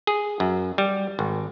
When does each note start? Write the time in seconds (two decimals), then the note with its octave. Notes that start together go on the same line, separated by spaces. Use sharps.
0.07 G#4
0.40 F#2
0.78 G3
1.19 G#1